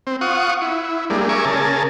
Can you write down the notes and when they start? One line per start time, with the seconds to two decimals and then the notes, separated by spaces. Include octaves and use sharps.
0.07 C4
0.21 F4 F#5 C#6 D#6
0.62 E4
1.10 G3 G#3 A#3 D4
1.29 A#4 E5 G#5 C#6 D6
1.45 C#3 G#4 A#4 A5